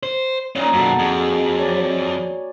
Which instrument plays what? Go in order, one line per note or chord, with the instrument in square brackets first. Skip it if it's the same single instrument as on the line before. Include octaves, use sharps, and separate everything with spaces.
[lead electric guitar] C5
[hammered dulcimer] A#2 D#4 [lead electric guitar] A#3 C#4
[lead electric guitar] F#2 B2 [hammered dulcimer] F#4 A4
[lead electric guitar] F2 [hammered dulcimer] G#4
[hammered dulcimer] C#5 D5 G#5